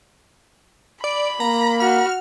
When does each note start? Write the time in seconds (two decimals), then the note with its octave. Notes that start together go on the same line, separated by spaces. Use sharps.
1.04 D5 B5
1.40 A#3 A#5
1.80 F#4 F6